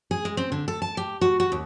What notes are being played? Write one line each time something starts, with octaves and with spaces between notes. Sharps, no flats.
G#4
G#3
C4
D3
A4
A5
G4
F#4
F#4
D#2